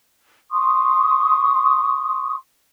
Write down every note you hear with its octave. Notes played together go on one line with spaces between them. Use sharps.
C6 C#6 D#6